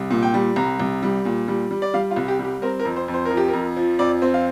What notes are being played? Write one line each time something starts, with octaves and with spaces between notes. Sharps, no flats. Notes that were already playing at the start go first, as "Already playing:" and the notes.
Already playing: C2
A#2
G5
G3
C2 A#5
C2
G3
A#2
G3
G3
D5
G3 F5
F4
C2
G4
G3
G4
C4 A#4
A#4
F2
C5
F2
C5
A#4
F3
G4
A#4
F2
F3
F2 D5
C4
F5